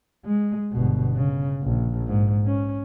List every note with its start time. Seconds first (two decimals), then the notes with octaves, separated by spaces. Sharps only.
0.25 G#3
0.72 G1 B2
1.15 C#3
1.62 A#1
2.08 G#2
2.46 C#4